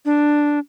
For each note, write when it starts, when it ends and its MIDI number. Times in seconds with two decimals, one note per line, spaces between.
0.05 0.59 62